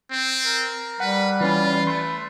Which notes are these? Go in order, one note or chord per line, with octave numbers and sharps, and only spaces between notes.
C4
A#4
G3 B4 F#5
E3 C#4 F4 B4
A3 C6